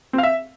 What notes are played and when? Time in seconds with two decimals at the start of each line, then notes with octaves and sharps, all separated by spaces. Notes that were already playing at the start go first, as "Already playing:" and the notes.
0.13 C4
0.18 F5
0.23 E5